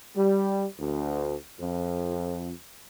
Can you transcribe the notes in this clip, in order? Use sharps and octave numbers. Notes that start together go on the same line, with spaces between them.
G3
D2
F2